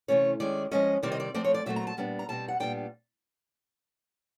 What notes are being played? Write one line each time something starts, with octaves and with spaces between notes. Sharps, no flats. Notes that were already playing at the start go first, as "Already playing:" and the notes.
C3 E3 A3 C#4 C#5
D#3 G#3 C#4 D5
F3 G#3 C#4 D#5
C3 D#3 G3 C4 D5
D#5
D5
F3 A3 C4 D5
C#5
D5
A#2 F#3 A3 C4 E5
A#5
A5
A#2 G3 B3 D4
A#5
B2 G3 C4 A5
F#5
A#2 G3 B3 D4 G5